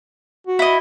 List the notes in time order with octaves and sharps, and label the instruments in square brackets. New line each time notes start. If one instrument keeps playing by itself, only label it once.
[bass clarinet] F#4
[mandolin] E4 D#5